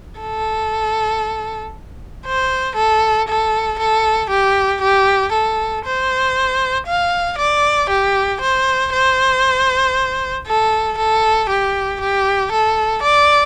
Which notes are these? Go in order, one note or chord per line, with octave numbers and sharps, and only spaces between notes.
A4
C5
A4
A4
A4
G4
G4
A4
C5
F5
D5
G4
C5
C5
A4
A4
G4
G4
A4
D5